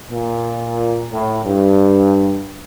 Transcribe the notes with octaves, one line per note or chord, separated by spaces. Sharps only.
A#2
A2
G2